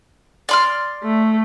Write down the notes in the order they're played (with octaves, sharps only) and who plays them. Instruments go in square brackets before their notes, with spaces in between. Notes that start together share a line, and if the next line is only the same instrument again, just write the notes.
[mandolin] D5 C6 F6
[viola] A3